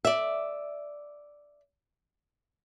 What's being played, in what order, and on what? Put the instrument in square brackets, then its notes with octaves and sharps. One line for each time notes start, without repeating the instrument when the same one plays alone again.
[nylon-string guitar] D5 E5